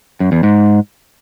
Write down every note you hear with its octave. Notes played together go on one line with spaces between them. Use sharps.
F#2
E2
G#2